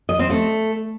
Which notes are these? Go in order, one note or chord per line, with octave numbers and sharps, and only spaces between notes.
D#5
C4
A3